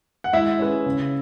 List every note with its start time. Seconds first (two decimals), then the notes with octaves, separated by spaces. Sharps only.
0.24 F#5
0.33 G#3 E4 E5
0.59 C#4 G#4 B4
0.86 C#3